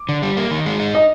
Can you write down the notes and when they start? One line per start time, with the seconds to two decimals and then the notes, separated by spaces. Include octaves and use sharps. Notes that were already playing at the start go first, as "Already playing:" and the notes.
Already playing: D6
0.09 D3
0.22 G3
0.37 A#3
0.51 D#3
0.66 G#3
0.80 D#4
0.95 D#5